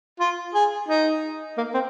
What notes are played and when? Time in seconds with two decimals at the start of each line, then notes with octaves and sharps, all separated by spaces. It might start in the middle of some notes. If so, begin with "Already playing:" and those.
0.19 F4
0.54 G#4
0.88 D#4
1.57 A#3
1.74 C4